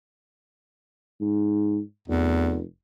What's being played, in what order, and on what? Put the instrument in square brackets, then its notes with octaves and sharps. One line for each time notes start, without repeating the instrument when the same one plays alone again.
[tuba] G#2
[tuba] F1 [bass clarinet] E2